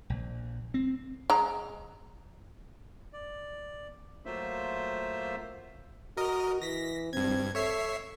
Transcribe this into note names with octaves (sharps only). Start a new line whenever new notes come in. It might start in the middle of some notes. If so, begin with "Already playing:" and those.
A#1
C4
G#3 A#5
D5
F#3 A3 A#3 F4 C5 E5
F#4 A#4 D#5
E3 A#6 B6
G2 C4 G#6
A4 C#5 E5 C7